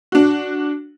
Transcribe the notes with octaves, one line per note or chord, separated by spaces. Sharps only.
D4 F#4